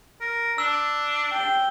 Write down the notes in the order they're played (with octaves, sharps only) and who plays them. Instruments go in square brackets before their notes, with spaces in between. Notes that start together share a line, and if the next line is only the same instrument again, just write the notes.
[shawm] A#4
[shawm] D4 [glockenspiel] E6
[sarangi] G5